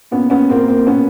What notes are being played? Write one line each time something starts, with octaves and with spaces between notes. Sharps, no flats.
A#2 B3 C#4
B3 C#4
A#2 A#3 C4
A#3 C4
B2 B3 C#4